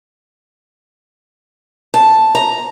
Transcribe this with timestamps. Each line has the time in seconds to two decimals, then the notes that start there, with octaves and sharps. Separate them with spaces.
1.94 A5
2.35 A#5